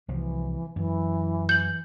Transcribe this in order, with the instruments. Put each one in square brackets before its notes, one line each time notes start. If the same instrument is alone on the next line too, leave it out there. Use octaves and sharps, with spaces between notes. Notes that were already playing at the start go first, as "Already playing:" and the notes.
[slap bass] C2 F3 [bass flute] E3
[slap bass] F#2 [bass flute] E3
[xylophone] G6 F#7